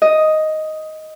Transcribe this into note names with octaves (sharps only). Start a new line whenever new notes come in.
D#5